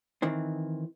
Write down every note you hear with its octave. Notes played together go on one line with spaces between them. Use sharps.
D#3 E3 C4